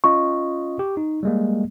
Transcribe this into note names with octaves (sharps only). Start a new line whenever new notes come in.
C#4 F4 D#5 C#6
G4
D#4
G3 G#3 A#3